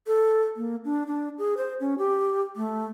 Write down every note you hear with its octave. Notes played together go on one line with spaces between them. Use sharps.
A4
A#3
D4
D4
G#4
C5
C#4
G4
A3